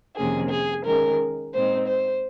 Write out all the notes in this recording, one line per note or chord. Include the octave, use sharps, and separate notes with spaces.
F2 C3 D#3 A#3 C#4 G#4
G#4
D#3 G#3 C#4 A#4
A#2 G#3 C4 D#4 C5
C5